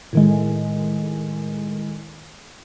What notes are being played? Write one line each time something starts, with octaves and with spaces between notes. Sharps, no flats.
A2 D#3 G#3